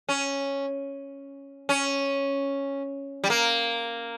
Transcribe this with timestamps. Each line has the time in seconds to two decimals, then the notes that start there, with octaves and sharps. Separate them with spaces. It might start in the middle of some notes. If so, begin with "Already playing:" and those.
0.09 C#4
1.69 C#4
3.24 G3
3.30 A#3